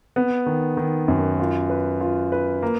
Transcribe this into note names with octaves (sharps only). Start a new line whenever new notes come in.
B3
D#3
D#3
F#2
F4
B4
F4
B4
A#3